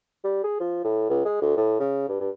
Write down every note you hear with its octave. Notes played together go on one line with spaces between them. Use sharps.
G3
G#4
F3
A2
C#2
G#3
D2
A2
C#3
G2
G2